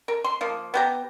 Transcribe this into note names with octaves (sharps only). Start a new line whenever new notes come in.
A#4
C6
F3 A#3
B3 G4 A#5